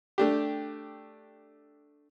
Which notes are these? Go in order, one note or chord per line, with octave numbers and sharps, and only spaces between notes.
A3 D4 G4